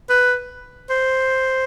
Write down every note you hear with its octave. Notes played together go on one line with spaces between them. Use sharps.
B4
C5